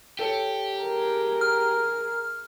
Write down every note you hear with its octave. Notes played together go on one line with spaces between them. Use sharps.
G4 A4 C#5 C#7
G#4 A#4
A#5 F6